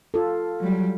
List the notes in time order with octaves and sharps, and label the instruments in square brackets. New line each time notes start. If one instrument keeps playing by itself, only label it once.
[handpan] F4 A4
[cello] F#3 G3